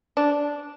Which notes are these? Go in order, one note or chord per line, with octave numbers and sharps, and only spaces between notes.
D4